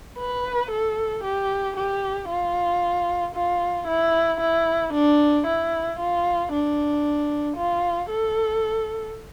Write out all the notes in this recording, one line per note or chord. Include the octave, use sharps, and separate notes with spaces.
B4
A4
G4
G4
F4
F4
E4
E4
D4
E4
F4
D4
F4
A4